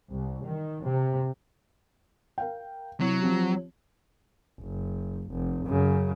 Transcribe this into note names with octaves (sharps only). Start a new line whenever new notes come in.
C2
D#3
C3
A#4 F5 G5
C3 F#3 E4
F3 C4 G4
F#1
F1
F#2 C#3